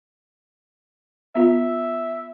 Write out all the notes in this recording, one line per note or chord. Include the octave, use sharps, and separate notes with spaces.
B3 F4 E5